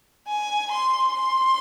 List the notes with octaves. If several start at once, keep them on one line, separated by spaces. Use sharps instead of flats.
G#5
C6
C6